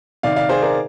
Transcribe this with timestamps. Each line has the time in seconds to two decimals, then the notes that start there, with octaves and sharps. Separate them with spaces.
0.23 C3 D#3 D5 F5
0.36 D5 F5
0.49 G#4 C5
0.62 A#4 D5